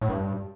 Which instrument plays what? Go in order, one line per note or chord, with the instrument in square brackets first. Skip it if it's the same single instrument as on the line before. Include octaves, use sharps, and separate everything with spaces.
[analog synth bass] A2
G2